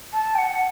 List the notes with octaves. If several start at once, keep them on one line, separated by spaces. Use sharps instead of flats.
A5
G5
F#5